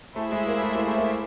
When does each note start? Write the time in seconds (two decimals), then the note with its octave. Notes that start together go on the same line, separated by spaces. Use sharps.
0.15 A3 E4 G#4 C5 E5
0.32 G#3
0.47 A#3
0.62 A3
0.75 A#3
0.87 A3
0.98 A#3